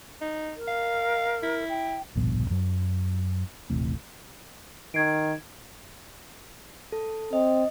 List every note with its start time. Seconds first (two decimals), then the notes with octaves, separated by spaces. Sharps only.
0.21 D#4
0.56 A#4
0.68 F5
1.43 E4
1.69 G5
2.15 D1 A#1 G2 B2
2.50 F#2 F#3
3.70 D#1 A1 A2 C3
4.94 D#3 G#6 C7 D7
6.92 A4
7.33 C4 D#5